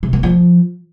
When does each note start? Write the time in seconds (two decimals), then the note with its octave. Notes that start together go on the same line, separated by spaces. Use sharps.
0.03 C3
0.13 A#3
0.23 F3